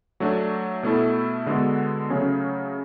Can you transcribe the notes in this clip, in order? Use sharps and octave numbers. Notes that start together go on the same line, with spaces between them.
F#3 A3 D4
B2 A3 E4 A4
D3 G#3 B3 F#4 A4
C#3 F#3 A3 C#4 G#4